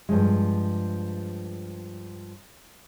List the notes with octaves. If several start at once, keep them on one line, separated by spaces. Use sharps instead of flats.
G2 F3 G#3